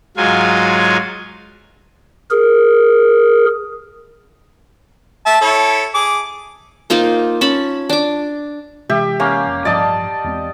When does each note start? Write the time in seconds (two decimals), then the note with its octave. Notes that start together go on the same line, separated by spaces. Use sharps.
0.17 G#2 F#3 F4 G#5
2.31 G#4 A#4
5.26 E5 A5
5.41 E4 A4 C#5
5.94 G#4 D6
6.90 A#3 D#4 F4 C5
7.41 C#4 A5 B5
7.89 D4 D6
8.89 C3 E3 G#3 G4 E5
9.20 A#3 C#4 F5
9.47 F1
9.65 A1 G2 F3 D5 D#5 A5
10.24 E2 G#3 C4